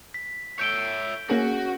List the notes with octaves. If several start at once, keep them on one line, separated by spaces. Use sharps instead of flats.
B6
C#5 E5 G6 D7 G7
A#3 C#4 F#4 G#4